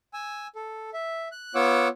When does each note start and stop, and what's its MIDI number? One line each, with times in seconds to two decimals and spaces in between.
0.13 0.47 80
0.13 0.47 88
0.55 0.90 69
0.94 1.28 76
1.32 1.55 90
1.55 1.88 59
1.55 1.88 65
1.55 1.88 73
1.55 1.88 78
1.55 1.88 86
1.55 1.88 88